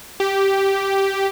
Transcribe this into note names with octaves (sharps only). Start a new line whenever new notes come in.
G4